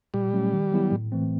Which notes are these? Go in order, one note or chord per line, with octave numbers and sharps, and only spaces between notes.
A#2 G3
F#3 A3 C#4
D#3
F#3 B3 E4 G4
A2
E3 A3 C4